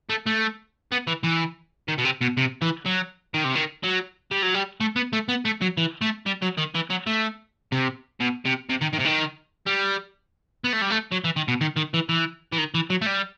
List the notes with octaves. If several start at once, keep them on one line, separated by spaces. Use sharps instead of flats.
A3
A3
B3
E3
E3
D#3
B2
C3
B2
C3
E3
F#3
D#3
C3
D#3
F#3
G3
F#3
G3
A3
B3
A3
B3
A3
F#3
E3
A3
G3
F#3
D#3
E3
F#3
A3
C3
B2
C3
C3
D#3
D#3
C3
D#3
G3
B3
A3
G3
A3
F#3
E3
D#3
B2
D#3
D#3
E3
E3
E3
D#3
E3
F#3
A3
G3